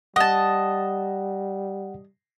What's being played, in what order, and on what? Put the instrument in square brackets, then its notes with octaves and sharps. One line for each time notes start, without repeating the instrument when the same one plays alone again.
[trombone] G3 [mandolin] D#5 A5 [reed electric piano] F#5